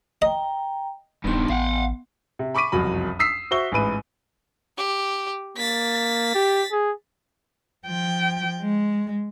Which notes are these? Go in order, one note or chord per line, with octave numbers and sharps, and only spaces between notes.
D#5 G5 A#5
D#1 G2 D#3 B3 C6
A1 F5 F#5
C3
B5 C#6 D6 B6 D#7
F#1 C2 F2 F#3 B5
D#6 E6 B6 C7
F#4 C5 E5 C#6 G7
A1 G#2 B4 D#7
G4
A#3 A6 B6
G4
G#4
F3 G5
G#3